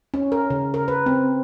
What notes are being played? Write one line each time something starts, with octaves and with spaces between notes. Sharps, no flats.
C#4
A#4
C#3
A#4
B4
C4